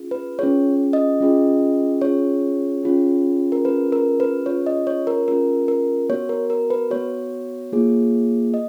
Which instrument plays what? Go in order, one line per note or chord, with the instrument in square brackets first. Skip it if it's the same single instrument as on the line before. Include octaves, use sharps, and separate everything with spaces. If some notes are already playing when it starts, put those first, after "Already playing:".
Already playing: [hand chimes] C#4 F4 G#4
B4
C#4 F4 G#4 C#5
D#5
C#4 F4 G#4
C#4 F4 G#4 C#5
C#4 F4 G#4
A#4
C#4 F4 G#4 B4
A#4
B4
C#4 F4 G#4 C#5
D#5
C#5
A#4
C#4 F4 G#4 A#4
A#4
B3 F#4 C#5
A#4
A#4
B4
B3 F#4 C#5
A#3 F4 G#4
D#5